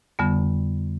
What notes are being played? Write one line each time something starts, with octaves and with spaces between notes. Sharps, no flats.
F2 D3 G3 B3